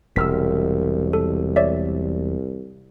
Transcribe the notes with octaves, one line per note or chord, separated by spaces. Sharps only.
E1 C2 E6 F6 B6
A4
C#5 D5 E5